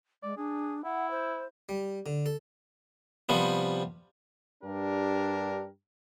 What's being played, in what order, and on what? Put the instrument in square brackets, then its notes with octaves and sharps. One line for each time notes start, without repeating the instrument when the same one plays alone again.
[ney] G#3 [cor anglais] D5
[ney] D4 [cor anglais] G#4
[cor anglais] E4 [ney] F#5
[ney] C5
[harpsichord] G3
D3
A4
C3 F3 G3 B3
[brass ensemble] G2 D4 G4 A#4